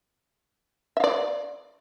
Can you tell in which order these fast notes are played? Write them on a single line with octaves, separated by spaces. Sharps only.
E5 F5 D5